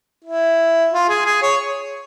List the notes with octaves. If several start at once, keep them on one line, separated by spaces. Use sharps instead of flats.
E4
F4
G#4
G#4
C#5